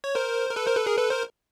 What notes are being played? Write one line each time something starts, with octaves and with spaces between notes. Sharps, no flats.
C#5
A#4 C5
A#4
A4 B4
A#4 C5
A4 B4
G#4 A#4
A4 B4
A#4 C5